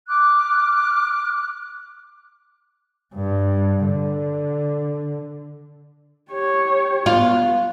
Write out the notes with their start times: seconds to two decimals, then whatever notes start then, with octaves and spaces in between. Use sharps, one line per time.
0.08 D6 F6 F#6
3.15 G2
3.86 D3
6.31 G4 C#5
7.06 B3 F4